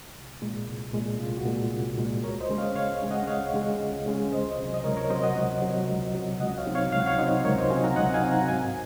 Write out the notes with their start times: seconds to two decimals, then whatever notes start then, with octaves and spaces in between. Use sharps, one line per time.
0.15 C2
0.42 A#2 G#3
0.67 C2
0.93 A#2 G#3
1.19 C2 F4
1.37 F#4
1.45 A#2 G#3
1.72 C2
1.97 A#2 G#3
2.23 C#2 A#4 C#5
2.40 C5 D#5
2.49 C#3 G#3 C#4
2.58 C#5 F5
2.75 C#2 C#5 F5
3.02 C#3 G#3 C#4
3.11 D#5 F#5
3.27 C#2 C#5 F5
3.54 C#3 G#3 C#4
3.81 C#2
4.06 C#3 G#3 C#4
4.32 C#2 C5 D#5
4.58 C3 F#3
4.74 D#5
4.84 C#2 A#4 C#5
4.97 A#4 C#5
5.10 C3 F#3 C5 D#5
5.23 D#5 F#5
5.36 C#2
5.62 C3 F#3
5.88 C#2
6.15 C3 F#3
6.40 C#2 D#5 F#5
6.58 C#5 F5
6.66 C3 F#3 C4 D#4
6.75 C#5 F5
6.92 C#2 F5
7.00 F#5
7.06 C#5 F5
7.18 C3 F#3 C4 D#4 C5 D#5
7.45 C#2 A#4 C#5
7.58 C5 D#5
7.70 C3 F#3 C4 D#4 F5 G#5
7.84 F#5 A#5
7.96 C#2 D#5 F#5
8.14 F5 G#5
8.22 C3 F#3 C4 D#4
8.31 F#5 A#5
8.48 G#2 F5 G#5